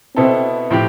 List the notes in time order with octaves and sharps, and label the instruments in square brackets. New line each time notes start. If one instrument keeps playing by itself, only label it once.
[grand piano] B2 B3 E4 A4 [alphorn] C4
[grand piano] A2 F3 C4 G4